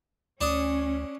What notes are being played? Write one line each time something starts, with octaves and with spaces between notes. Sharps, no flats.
D2 C#4 D4 D#6